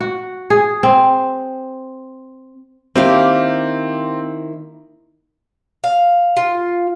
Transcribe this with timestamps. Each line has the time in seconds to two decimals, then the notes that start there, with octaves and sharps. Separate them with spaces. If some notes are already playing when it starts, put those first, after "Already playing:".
0.01 F#4
0.50 G#4
0.83 C4
2.96 D#3 A#3 C4 E4 G4 F5
5.84 F5
6.37 F4